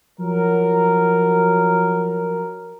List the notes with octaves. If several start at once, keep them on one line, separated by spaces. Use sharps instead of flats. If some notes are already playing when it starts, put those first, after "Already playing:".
F3 F#3 A#4